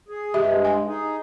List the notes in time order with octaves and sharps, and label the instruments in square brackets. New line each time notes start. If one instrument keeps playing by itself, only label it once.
[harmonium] G#4
[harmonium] G2 G#3 [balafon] G4 E5
[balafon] G#5
[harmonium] D#4 G#4